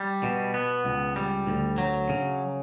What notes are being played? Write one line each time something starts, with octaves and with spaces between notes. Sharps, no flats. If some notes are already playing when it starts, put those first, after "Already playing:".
Already playing: G3
B2
B3
C#2
G3
D2
F#3
C#3